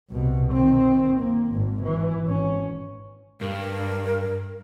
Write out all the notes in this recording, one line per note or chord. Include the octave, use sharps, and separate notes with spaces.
C2 B2
D#3 C4
A#3
G#1 G#2
E3
G#1 C#4
G2 A#4